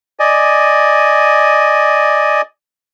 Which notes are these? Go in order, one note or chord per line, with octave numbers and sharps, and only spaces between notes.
D5 D#5 G#5